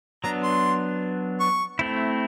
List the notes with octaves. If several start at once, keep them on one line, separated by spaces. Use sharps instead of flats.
F#3 B3 D4 A#5
C6
C#6
A3 C4 E4